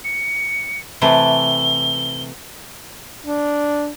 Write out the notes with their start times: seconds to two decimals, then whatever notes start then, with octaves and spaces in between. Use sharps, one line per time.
0.04 C#7
1.02 C3 E3 A3 G7
3.24 D4